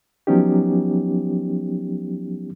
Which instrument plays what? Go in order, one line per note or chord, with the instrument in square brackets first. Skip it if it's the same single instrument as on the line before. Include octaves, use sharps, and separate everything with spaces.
[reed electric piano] F3 F#3 B3 C#4 D#4 G4